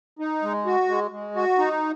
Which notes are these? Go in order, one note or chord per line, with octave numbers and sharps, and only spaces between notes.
D#4
G#3
F#4
G#3
G#3
F#4
D#4